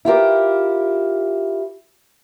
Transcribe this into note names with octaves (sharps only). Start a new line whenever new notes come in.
E4 F4 G4 A#4